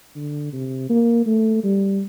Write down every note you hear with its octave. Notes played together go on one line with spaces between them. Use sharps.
D3
C3
A#3
A3
G3